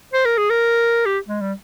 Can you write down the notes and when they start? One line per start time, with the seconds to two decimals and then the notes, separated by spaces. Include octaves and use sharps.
0.14 C5
0.25 A#4
0.38 G#4
0.50 A#4
1.06 G4
1.29 G#3
1.41 G3